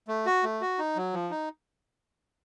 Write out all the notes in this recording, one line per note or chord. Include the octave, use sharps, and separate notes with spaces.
A3
F#4
A3
F#4
D#4
F#3
F3
D#4